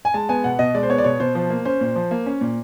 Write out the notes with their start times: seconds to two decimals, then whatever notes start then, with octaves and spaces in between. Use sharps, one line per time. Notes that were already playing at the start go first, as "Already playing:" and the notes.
0.05 G#5
0.14 G#3 A5
0.29 B3 G#5
0.44 B2 F#5
0.59 B2 D#5
0.75 G#3 D5
0.83 C5
0.90 B3 C#5
0.98 D5
1.04 B2 C#5
1.20 B2 C5
1.35 F3 C5
1.50 A#3
1.65 C#4 C5
1.81 A#2
1.96 F3
2.11 A#3
2.26 C#4
2.41 A#2